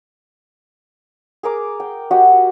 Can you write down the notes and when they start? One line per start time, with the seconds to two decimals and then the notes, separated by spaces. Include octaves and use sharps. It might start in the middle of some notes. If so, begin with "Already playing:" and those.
1.43 G#4 A#4 D6
1.80 G5
2.11 F#4 G4 D#5 F#5